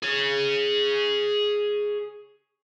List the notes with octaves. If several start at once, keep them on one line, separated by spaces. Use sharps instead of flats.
G#4 C#5